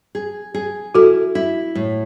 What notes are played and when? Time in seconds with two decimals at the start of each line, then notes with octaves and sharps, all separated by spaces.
0.15 G#4
0.54 G#4
0.95 E4 F#4 A4
1.35 E4
1.75 A2